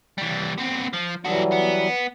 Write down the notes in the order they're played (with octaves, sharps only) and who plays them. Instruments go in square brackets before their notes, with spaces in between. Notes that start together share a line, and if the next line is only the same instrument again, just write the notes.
[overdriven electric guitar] E3 G3
B3 C4
F3
[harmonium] E3 F#3 G3 [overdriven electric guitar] F#4 A4
[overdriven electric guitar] B3